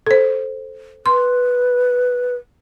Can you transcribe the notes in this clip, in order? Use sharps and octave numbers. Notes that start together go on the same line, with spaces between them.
A4 C5
B4 C6